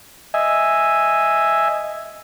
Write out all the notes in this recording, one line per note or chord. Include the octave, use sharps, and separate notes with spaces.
D#5 E5 G#5